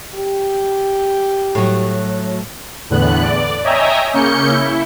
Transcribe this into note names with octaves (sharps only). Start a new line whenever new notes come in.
G4
A2 F#3
E2 A2 D3 B3 F#6
D5
C#5 D#5 E5 G5 G#5 A#5
C#3 A#3 C#4 G6 C#7
E4